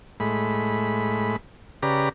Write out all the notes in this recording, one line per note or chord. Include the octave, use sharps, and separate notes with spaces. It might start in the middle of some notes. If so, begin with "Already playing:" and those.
A2 G#3 B5
C#3 G4 B4 D5 A#5